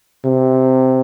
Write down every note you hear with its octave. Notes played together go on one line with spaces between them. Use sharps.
C3